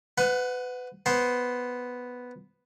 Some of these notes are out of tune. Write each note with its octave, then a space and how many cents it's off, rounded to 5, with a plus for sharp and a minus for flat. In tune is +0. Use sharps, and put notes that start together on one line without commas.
B4 +25 F#5 -10
B3 +0 C5 +0